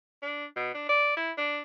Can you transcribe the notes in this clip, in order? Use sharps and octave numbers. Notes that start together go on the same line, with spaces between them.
D4
B2
D4
D5
E4
D4